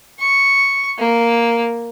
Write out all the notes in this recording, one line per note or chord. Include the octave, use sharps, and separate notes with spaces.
C#6
A#3